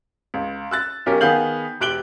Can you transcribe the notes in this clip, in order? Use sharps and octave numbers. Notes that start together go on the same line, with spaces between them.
C#2
E6 F#6 A6
B1 C#4 G4 A#4
D#3 B3 G#4 F5 G6 F#7
E1 G4 F#6 D7 F#7 G7